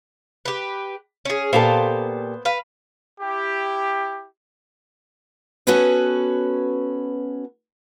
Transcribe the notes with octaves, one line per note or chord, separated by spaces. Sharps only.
G4 B4
C#4 G#4
A#2 B3 G4 A4 C5 F5
B4 F5
E4 G4
B3 C#4 F#4 A4 B4 C#5